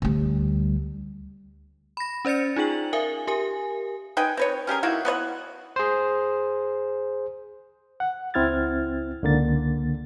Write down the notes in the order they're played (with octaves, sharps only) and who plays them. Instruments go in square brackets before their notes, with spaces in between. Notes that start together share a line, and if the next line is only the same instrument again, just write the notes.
[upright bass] D2 G3
[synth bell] B5 A#6
C#4 C5 D5 A6 C#7
D#4 F4 G#4 G5 F#7
A#4 E5 F5 G#5
G4 A#4 G#5
[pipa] D#4 B4 G5 G#5
C4 B4 C#5
C#4 G4 G#4 A#4
D#3 A#3 E4 F#4
B3 B4 C#5 F#5
[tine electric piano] G#4 C5
[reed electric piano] F#5
C#2 C4 E4 F6 G#6 A6
C#2 D3 A#3 A6